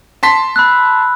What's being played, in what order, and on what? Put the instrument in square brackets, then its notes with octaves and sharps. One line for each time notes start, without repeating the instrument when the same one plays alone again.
[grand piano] A5 C6 B6
[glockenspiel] B5 E6 F#6